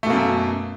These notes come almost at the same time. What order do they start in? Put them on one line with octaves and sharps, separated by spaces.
A3 B2 A#3 F#2